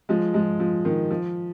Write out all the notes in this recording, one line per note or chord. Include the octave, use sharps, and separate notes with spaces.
F3 G#3
F3 G#3
F3
D#3
F3